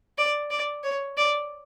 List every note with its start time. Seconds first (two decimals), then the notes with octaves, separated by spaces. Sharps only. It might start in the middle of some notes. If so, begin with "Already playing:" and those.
0.18 D5
0.50 D5
0.83 C#5
1.17 D5